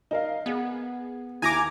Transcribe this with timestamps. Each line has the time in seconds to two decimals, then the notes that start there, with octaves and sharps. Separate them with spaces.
0.11 D#4 A#4 F5
0.46 B3 G#4
1.42 D#2 E4 G#5 A#5 D6 D#6